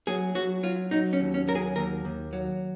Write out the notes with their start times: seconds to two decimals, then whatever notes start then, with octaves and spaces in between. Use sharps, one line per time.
0.07 F#3 G#4
0.35 F#3 F#4
0.63 F#3 F4
0.91 F#3 D#4
1.13 C#4
1.20 D#2
1.34 C#4
1.48 F#3 A#4
1.55 G#4
1.76 D#2 A#4
2.05 D#2
2.33 F#3